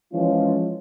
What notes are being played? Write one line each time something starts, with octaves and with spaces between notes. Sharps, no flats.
E3 F3 G#3 C#4 F4